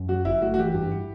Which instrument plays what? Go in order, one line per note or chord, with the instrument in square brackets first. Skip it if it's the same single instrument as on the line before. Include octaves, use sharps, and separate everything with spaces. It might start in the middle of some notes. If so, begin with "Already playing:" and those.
Already playing: [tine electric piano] F#2
[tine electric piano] F#3 [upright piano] F#4
[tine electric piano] G1 [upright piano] E4
[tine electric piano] A3 [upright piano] F#4
[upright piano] F#4
[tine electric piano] E3 [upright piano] G4
[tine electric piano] G2
E4